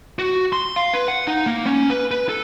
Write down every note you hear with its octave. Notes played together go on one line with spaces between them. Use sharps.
F#4
C6
F5
B4
F#5
D#4
A#3
C#4
B4
B4
A4